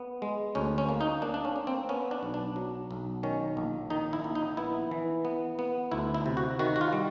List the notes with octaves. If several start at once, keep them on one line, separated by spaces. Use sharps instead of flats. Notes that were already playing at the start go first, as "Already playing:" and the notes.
Already playing: B3
G#3
D2 C#4
C#4
A#3
D#4
A#3 D4
D4
C#4
A#3
C4
B3 C#4
D4
B1
D4
F#3
B1
D#3 C#4
A#1
D#3 D#4
E4
A#1
D#4
B3 E4
E3
B3
B3
D2 E4
E4
C3
F#4
D#3 F#4
F#4
F4
G3